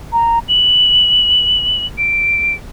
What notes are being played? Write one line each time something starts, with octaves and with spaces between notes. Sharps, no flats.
A#5
F#7
D7